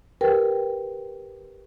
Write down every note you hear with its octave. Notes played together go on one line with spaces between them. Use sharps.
G4 A#4 B4 G5